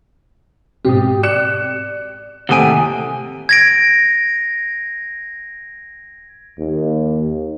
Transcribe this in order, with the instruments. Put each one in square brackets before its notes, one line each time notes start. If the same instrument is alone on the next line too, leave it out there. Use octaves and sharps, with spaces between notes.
[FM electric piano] G#2 B2 C4 [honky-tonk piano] G4 D#6
[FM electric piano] D5 [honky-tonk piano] F#6 C#7 E7
[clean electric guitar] D#2 A2 G#5 [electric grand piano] C3 D#6 D7 [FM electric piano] A4 F#5
[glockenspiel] G#6 A#6 D7
[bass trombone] D#2